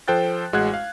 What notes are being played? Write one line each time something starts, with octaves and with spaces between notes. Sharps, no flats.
F3 A4 C5 G5 F#6 A6
A1 G#3 F#4 F#5 F#6 G#6
F5